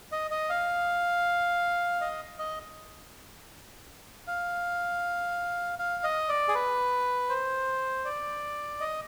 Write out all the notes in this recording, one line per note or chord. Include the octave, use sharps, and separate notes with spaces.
D#5
D#5
F5
D#5
D#5
F5
F5
D#5
D5
G#4
B4
C5
D5
D#5